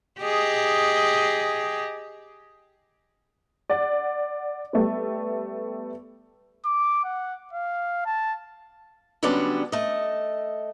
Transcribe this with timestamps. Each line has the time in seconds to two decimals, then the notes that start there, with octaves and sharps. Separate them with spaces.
0.21 G4 G#4 D#5
3.70 D5 F#5
4.73 G3 A3 B3
6.65 D6
7.04 F#5
7.53 F5
8.06 A5
9.23 D3 F#3 G3 B3 C#4 D4
9.72 A3 D#5